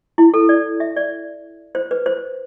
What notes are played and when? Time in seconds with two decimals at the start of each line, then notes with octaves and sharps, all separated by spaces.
0.18 E4
0.34 A4
0.49 D5
0.80 E5
0.96 D5
1.75 C5
1.91 B4
2.06 C5